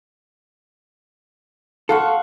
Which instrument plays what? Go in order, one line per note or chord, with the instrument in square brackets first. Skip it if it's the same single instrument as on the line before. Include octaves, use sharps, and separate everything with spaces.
[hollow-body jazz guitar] A4 [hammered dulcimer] F5 F#5 C#6